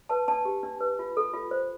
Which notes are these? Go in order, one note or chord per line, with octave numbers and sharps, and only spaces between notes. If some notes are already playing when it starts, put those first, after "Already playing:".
B4 A5
D4 A5
G4
D4
B4
F4
A4
F4
C5